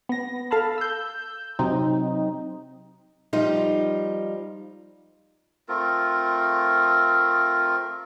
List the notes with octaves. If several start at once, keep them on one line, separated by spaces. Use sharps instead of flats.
B3 A#6
A4 F5 A5 B5
E6 G6
C3 F#3 C4 D#4
F3 G3 D#4 F4
A3 C4 F4 A#4